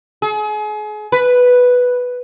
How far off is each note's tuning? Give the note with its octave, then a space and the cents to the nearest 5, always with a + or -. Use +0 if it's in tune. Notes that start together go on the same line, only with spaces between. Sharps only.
G#4 +35
B4 +0